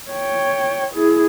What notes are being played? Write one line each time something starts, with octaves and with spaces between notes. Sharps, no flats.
C#5 G5
E4 G#4